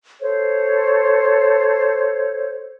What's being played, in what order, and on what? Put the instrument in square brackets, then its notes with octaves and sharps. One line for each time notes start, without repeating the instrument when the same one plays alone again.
[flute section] A4 C5 C#5